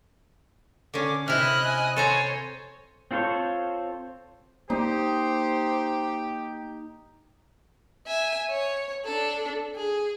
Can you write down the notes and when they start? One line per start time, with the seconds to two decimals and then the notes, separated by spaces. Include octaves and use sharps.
0.94 D3 C#4 D6
1.28 C3 E4 D#5 F6 F#6
1.64 G#5
1.96 A4 C5 C#5 G#5 A#5
3.11 C4 F4 A4 C5 C#5
4.70 A#3 D#4 G4 C5
8.07 E5 G#5
8.50 C#5
9.05 D4 A4
9.75 G#4